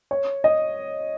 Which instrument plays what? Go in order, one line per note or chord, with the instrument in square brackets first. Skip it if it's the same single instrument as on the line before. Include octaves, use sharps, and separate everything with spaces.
[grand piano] C#5
D#5